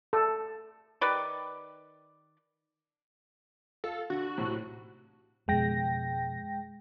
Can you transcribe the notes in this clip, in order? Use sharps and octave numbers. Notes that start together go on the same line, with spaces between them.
A4
D#3 G4 B4 D5
F4 A4
D3 F#4
B1 A2 C3
F2 B2 G#3 G5 A#6